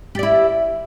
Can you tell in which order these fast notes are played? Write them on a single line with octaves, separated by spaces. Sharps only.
G4 D5 E4